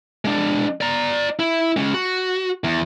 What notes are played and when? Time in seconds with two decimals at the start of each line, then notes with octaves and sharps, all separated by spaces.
0.25 G#3 D4
0.81 D5 A#5
1.40 E4
1.77 G#3 C#4
1.94 F#4
2.64 E2